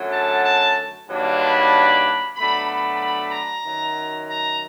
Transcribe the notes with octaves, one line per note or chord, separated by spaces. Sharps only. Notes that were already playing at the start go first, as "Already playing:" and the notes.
Already playing: F#2 D3 F#3 A3
A5
A5
G2 D#3 F#3 A#3 D4
B5
B2 F#3 A3 D4 B5
B5
B5
A#5
F#2 D#3 F#3
A#5